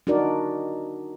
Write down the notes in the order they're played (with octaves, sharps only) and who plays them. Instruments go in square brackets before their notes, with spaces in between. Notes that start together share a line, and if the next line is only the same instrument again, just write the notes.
[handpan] D4 D#4 F#4 A#4 D5